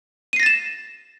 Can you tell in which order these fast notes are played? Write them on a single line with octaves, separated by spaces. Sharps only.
D#7 C7 A#6 A6 E7